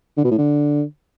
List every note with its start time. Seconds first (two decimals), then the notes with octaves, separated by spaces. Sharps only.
0.17 D3
0.24 B2
0.31 A2
0.38 D3